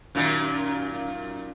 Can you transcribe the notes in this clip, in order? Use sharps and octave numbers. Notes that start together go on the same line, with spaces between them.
F#2 A#2 D#3